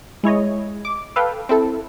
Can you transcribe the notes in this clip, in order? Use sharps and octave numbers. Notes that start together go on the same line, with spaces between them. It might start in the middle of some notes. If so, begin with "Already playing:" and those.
G#3 E4 C#5 D#5
D6
A4 B4 F5 G5
C4 E4 A4